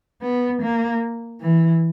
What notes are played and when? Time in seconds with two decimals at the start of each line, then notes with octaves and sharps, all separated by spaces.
0.22 B3
0.62 A#3
1.41 E3